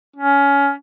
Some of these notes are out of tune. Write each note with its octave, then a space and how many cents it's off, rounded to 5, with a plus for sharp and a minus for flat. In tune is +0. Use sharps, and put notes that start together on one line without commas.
C#4 +20